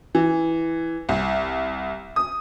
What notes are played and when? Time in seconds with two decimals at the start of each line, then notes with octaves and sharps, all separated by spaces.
0.15 E3
1.09 C2
2.16 D#6